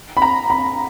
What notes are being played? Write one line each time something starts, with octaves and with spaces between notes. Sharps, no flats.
B5
A#5
B5